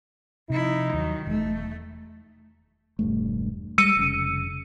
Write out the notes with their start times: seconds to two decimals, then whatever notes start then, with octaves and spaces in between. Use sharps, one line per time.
0.50 C3 F3 D#4 E4
0.93 D#2 D#3 F#3
1.27 E1 A3
2.99 E1 G2 A3
3.78 G3 G#3 E6 C#7 D#7
3.97 F1 C#3